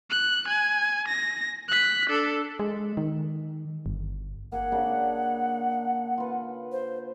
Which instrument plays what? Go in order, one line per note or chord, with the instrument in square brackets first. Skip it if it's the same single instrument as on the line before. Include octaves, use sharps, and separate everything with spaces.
[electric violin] F#6
G#5
A#6
F#6 B6
D4 A4
[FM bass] G#3
D#3
G1
[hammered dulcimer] A#3 G#4 [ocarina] F#5
[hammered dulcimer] C#3 A#3 D4
F4 B4
[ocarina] C5